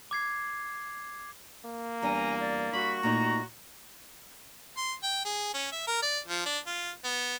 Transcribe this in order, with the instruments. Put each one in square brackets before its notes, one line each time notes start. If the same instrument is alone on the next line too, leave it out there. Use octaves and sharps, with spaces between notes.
[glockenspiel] D6 G#6 C7
[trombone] A#3
[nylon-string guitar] E2 G3 D4 [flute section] G#5 A#5
[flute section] D5
[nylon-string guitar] G3 [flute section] F#4 C#6 [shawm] B5
[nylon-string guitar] A#2 A3 D#4 [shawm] A#5
[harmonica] C6
G5
G#4
C#4
E5
A#4
D5
F3
D4
F4
B3